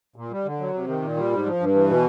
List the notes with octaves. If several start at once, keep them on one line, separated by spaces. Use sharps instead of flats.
A#2
G3
D3
F#3
C3
D#3
A#2
G3
G#2
F3
G2
E3
B2